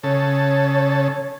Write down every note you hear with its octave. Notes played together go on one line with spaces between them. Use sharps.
C#3 A4 C#5